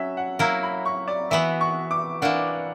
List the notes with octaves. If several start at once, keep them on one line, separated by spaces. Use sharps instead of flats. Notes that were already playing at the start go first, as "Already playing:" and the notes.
Already playing: F#3 C#4 F#4 E5
F#5
F#3 A#3 E4 A#5
B5
C#6
D5
E3 B3 F#4 E5
C#6
D6
E3 A#3 D4 F#5